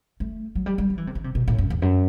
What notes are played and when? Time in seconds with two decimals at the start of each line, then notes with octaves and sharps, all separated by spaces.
0.20 A3
0.55 F#3
0.66 G3
0.78 G3
0.90 F#3
0.98 E3
1.07 C3
1.15 D#3
1.24 C3
1.35 B2
1.48 A2
1.59 F#2
1.70 E2
1.82 F#2